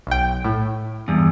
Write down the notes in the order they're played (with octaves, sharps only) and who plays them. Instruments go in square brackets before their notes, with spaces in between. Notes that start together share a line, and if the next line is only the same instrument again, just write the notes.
[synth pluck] B1 G5
A2
[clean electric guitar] E2 G2